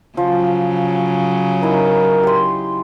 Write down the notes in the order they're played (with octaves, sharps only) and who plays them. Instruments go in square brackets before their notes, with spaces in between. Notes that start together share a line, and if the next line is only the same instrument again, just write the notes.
[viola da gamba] C#3 F#3 [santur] F3
[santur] D#4 E4 [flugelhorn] A#4
[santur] G4 C6